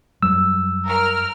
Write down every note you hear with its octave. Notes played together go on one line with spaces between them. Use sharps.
F#2 F#3 G3 E6
A#4 F6